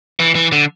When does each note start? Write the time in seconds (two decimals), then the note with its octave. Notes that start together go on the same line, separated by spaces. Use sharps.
0.20 E3
0.35 E3
0.52 D3